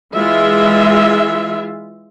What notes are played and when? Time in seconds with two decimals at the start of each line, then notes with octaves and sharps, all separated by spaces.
0.14 E3 G#3 F4 E5